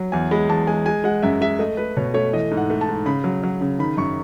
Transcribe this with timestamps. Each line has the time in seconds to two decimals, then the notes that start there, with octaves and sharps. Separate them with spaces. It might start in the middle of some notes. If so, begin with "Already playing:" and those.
Already playing: F#3
0.12 E2 G#5
0.31 G#3 B5
0.49 E2 A5
0.67 G#3 G#5
0.86 G#3 G#5
1.04 G#3 F#5
1.23 F#2 E5
1.41 G#3 E5
1.59 A3 D#5
1.77 A3 B4
1.97 B2 C#5
2.14 A3 C#5
2.33 E3 D#5
2.51 G#2
2.57 F#5
2.70 A3
2.81 A5
2.88 G#2
3.06 C#3 B5
3.24 F#3
3.44 F#3
3.61 C#3
3.79 D#3 B5
3.97 F#2 C#6